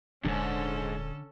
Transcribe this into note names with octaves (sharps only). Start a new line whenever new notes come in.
D#1 D#2 G#2 D3 C#4 D4 A4